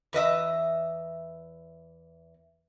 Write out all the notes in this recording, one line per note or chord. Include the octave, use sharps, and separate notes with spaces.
E2 B4 D#5 E5